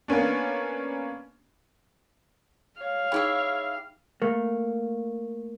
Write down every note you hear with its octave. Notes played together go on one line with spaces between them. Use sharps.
A#3 B3 C#4 D4
C#5 F5
D#4 E4 G4 G#4 E5 G5
A3 A#3